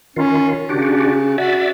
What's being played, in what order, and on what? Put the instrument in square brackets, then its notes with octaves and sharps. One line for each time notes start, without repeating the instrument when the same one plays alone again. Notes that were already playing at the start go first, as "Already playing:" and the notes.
[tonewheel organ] D#3 F4 [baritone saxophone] C#4
[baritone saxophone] C#3 [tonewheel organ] D4 F#4 G4
[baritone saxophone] F#4 [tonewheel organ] D5 E5